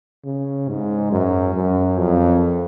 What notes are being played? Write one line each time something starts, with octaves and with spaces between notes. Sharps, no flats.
C#3
G#2
F#2
F#2
F2